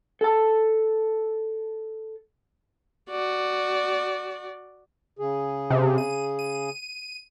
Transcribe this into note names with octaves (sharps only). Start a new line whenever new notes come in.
A4 A5
F#4 D5
C#3 G#4
C3
D#7
D#7